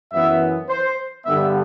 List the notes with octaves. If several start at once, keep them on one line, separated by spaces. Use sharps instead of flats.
F#2 E3 B3 E5
C5
G2 D3 G3 B3 E5